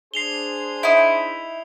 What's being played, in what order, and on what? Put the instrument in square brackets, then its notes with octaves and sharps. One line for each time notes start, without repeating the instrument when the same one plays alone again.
[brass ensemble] D4 G#4 C5 [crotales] C7 F7 G7
[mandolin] D#4 E4